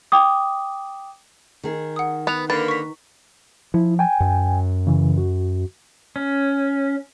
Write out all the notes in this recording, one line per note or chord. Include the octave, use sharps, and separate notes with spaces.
G5 D6 D#6
D#3 G#4
F#5 D#6
B3 F#6 F7
D3 A#3 B4 A6
C#6 B6
F3 E4
G5 G#5
F#2
C#3 E3
F#4
C#4